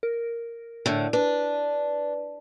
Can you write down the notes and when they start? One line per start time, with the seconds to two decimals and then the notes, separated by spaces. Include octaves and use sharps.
0.03 A#4
0.86 A2 D3
1.13 D4 B4